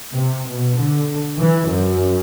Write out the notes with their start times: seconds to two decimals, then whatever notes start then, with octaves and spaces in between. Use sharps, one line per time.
0.14 C3
0.48 B2
0.79 D3
1.38 E3
1.70 F#2